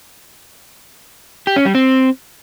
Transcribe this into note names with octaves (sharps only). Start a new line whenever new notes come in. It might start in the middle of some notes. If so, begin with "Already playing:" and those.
G4
C#4
G3
C4